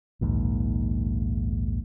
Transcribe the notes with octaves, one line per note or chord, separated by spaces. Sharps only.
A#1 D#2 G#2